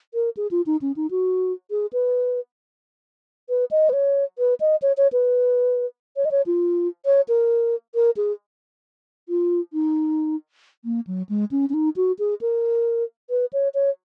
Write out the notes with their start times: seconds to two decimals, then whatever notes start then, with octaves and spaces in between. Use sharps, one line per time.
0.14 A#4
0.37 G#4
0.51 F4
0.66 D#4
0.81 C#4
0.96 D#4
1.11 F#4
1.71 G#4
1.93 B4
3.49 B4
3.71 D#5
3.89 B4
3.93 C#5
4.38 B4
4.60 D#5
4.82 C#5
4.97 C#5
5.12 B4
6.16 C#5
6.25 D#5
6.31 C#5
6.46 F4
7.05 C#5
7.28 A#4
7.95 A#4
8.17 G#4
9.29 F4
9.73 D#4
10.85 A#3
11.07 F#3
11.29 G#3
11.51 C#4
11.69 C#4
11.74 D#4
11.96 F#4
12.19 G#4
12.41 A#4
13.30 B4
13.53 C#5
13.74 C#5